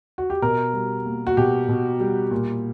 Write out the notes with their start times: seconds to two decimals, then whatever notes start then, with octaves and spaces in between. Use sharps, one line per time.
0.18 F#4
0.30 G4
0.42 B2 A#4
0.74 G3
1.06 A#3
1.27 F#4
1.37 B2 G4
1.69 B2
2.00 G3
2.31 A#2